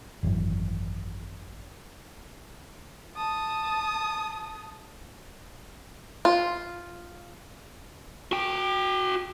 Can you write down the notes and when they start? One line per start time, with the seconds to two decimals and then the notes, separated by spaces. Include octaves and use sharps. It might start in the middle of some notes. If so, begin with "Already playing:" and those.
0.23 G#1 F#2 E3
3.16 A5 D#6
6.25 F4
8.32 F#4 G5